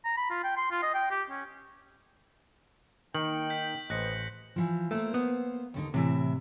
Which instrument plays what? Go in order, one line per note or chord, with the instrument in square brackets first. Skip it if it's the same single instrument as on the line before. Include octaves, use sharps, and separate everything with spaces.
[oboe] A#5
B5
F4
G5
C6
F4
D#5
G5
G4
C#4
[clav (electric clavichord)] D#3 [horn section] A#3 D#4 G5 [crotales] F#7
[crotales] G6 B6
[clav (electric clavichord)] A1 [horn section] B4 C5 D#5 [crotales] F#6 A#6 C#7
[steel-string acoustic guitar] E3 F3
[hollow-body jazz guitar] A3 [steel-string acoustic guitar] A#3 C5
[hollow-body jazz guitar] B3
[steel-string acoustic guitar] D#2 D3 D#4
[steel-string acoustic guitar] A2 E3 E5 [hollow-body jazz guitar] C3